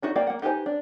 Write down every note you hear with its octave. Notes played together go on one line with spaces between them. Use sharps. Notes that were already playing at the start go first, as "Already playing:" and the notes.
D4 D#4 F#4 E5
A#3 D5 F5 G5
A#3 F#5
D#4 G4 B4 C5 G#5
D4